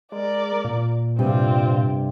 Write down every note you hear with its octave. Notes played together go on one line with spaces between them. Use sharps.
G#3 A#4 D5
A#2
G2 C3 G3 C4 F4